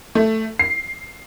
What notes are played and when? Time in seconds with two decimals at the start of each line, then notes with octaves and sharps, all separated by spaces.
0.15 A3
0.59 C7